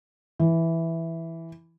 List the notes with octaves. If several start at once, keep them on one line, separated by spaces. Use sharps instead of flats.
E3